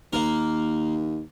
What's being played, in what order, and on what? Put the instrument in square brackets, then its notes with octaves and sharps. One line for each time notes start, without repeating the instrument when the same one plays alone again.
[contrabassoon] D#2 [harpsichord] A#3 A#4